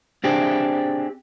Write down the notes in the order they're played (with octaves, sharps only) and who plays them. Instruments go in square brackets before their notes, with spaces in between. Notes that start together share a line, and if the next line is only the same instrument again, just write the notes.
[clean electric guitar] C4 D4 G4 G#4